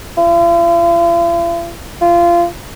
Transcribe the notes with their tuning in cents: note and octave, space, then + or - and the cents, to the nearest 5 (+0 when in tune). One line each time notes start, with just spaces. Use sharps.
F4 -45
F4 -20